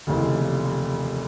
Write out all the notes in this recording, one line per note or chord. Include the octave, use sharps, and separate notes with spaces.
F1 D#2 C#3 E3